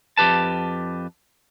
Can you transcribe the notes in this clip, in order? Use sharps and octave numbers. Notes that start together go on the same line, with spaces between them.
F2 G4 B4 A5